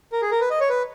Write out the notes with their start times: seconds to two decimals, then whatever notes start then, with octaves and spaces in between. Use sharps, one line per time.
0.12 A#4
0.22 G#4
0.31 A#4
0.40 B4
0.51 D#5
0.60 C#5
0.69 B4